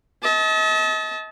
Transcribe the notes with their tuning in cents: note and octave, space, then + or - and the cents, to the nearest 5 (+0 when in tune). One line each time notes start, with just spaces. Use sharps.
D#5 +40 A5 -20